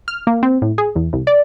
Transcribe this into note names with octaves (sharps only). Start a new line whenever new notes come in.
F6
A#3
C4
A2
G#4
E2
C2
D5